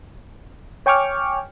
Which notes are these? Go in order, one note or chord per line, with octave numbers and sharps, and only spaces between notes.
C#5 G5 G#5 C#6 D6 F6